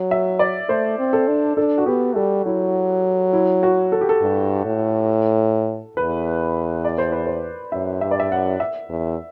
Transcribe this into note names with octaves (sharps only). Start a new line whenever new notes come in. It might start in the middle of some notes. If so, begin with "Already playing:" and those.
Already playing: F#3
E5
D5
A3 C5
C4
A4
D4
D4 A4
F#4
B3 G4
G3 A4
F#3 E4
E4
F#4
A4
G4
A4
G2
A2
E2 B4
D5
C5
B4
C5
F#2 E5
G2 E5
D5
E5
F#2 F#5
E5
E2